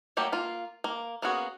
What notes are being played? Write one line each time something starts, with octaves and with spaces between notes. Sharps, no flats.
F#3 A3 A#3 G4
A#3 F4
A#3
A#3 B3 C#4 F#4 G#4